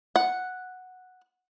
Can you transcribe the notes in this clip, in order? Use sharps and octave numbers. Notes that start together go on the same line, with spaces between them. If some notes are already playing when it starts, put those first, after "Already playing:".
F#5